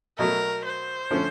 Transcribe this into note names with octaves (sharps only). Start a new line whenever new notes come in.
B2 F#3 A3 A#4
C5
D3 F3 A3 C#4